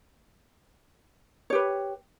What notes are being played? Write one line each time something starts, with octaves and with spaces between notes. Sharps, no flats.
G4 B4 C#5